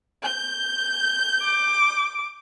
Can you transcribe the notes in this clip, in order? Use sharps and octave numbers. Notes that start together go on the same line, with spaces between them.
G6
D6